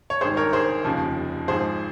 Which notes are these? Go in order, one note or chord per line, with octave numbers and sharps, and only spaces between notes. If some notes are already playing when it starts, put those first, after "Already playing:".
C#5
G#1 G2 D#3 G#4 C5
A#4 C#5
G#4 C5
F1 D#2 C#3 F3
G#1 G#2 F3 G#4 C5